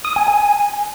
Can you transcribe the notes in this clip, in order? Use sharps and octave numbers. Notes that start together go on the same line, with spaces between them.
D#6
G#5
G#5